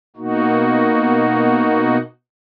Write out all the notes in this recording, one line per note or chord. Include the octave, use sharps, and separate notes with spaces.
B2 A#3 D#4 F#4